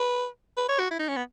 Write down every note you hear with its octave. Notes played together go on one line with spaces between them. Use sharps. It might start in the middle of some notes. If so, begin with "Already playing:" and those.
Already playing: B4
B4
C#5
F#4
E4
D#4
C#4
B3